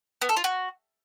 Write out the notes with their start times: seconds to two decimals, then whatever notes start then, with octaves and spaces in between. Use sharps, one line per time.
0.21 B3
0.29 A4
0.37 F4
0.44 F#4